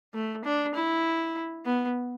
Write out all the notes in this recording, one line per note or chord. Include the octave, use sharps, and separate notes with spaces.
A3
D4
E4
B3